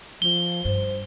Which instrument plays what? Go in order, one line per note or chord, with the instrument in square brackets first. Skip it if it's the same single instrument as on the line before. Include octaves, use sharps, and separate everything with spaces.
[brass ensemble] F3 [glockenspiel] G7
[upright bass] G2 [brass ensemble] C5